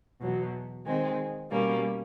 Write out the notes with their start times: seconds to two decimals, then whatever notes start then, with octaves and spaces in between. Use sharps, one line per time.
0.21 E2 B2 F#3
0.85 D#3 G#3 C4
1.50 B2 G3 A#3 C#4